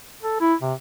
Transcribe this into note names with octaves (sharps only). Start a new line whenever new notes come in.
A4
E4
C3